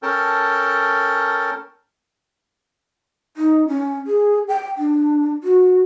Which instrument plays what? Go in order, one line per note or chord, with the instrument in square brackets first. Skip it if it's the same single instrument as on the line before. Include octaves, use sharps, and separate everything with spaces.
[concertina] C#4 A4 A#4 G5 A5
[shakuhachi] D#4
C#4
G#4
G5
D4
F#4